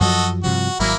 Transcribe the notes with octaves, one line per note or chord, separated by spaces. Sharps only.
F#2 F3 F#3 F#4 A4 D#5
G2 C3 F3 F#4
G#1 F#3 A#3 E4